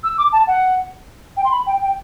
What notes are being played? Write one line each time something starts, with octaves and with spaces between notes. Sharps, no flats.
E6
D6
A5
F#5
G5
C6
B5
G5
G5